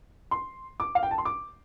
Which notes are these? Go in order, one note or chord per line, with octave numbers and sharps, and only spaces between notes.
C6
D6
F5
G5
A5
C6
D6